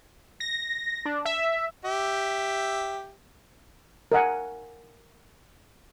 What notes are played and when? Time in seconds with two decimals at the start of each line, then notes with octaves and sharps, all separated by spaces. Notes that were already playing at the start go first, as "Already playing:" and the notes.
0.40 A#6
1.05 D4
1.25 E5
1.85 G4 E5
4.12 A#4 D#5 F#5 G#5